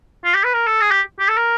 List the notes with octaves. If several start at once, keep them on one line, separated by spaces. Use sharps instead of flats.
F4
G4
B4
A#4
A4
G#4
G4
G4
A4
A#4